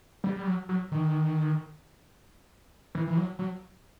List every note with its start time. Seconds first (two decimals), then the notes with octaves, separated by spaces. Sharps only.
0.24 G3
0.36 G3
0.47 F#3
0.69 F#3
0.91 D#3
2.95 E3
3.07 E3
3.17 F#3
3.39 F#3